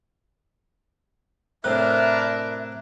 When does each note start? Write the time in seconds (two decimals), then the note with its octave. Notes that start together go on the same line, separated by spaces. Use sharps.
1.64 A2 C3 D4 E4 A#4 E5 F#6